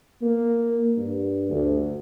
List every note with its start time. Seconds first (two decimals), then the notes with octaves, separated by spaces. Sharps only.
0.22 A#3
0.97 G2
1.50 D2